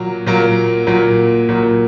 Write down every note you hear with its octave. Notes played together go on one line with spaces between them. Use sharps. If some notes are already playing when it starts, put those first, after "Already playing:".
Already playing: A#2 F#3 A#3
A#2 F#3 A#3
A#2 F#3 A#3
A#2 F#3 A#3